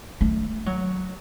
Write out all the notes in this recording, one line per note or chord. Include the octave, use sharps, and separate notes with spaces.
A3
F#3